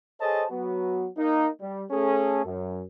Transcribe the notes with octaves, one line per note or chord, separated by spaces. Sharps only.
G#4 A4 C5 C#5 D#5 A5
F#3 B3 F#4
A#3 D#4
G3
A3 C#4 G#4 A4
F#2